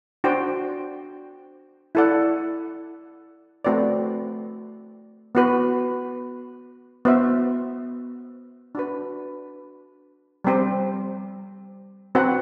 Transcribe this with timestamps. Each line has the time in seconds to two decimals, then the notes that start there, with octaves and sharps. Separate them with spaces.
0.24 D4 F#4 C5 G5
1.95 E4 A4 D5 F#5
3.65 A3 C4 F#4 B4 D5
5.35 B3 F#4 B4
7.05 B3 F#4 C5 E5
8.75 D4 F#4 B4
10.44 G3 C4 G4 C5
12.15 C4 F#4 B4 F#5